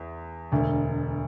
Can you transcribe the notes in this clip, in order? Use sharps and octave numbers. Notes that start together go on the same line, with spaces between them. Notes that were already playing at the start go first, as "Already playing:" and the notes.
Already playing: E2
E1 D2 D3